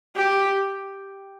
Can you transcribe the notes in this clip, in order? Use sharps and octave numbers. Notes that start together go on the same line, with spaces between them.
G4